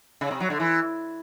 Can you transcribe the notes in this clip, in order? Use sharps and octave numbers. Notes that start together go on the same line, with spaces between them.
C#3
C3
F#3
D3
E3